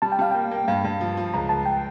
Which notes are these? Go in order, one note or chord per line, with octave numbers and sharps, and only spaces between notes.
G3 A5
G5
G3 F5
A#3 G5
A#3
G2 F5
G2
F3
F3
C#2 A#5
C#2 A5
G5